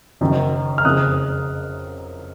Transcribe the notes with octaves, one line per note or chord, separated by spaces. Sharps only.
F#1 F#2 D#3
F6
F#1 F2 C#3 D#6 F#6